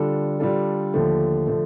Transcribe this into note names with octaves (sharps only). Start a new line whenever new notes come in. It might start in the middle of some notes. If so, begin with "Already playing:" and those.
Already playing: D3 G3 D4 F4 A4
D3 G3 D4 F4 A4
D#2 D3 F3 A3
D3 F3 A3